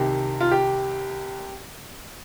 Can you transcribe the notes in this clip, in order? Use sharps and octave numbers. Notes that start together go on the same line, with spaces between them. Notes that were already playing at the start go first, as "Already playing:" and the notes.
Already playing: C2 C3 D#3 G4
F4
G4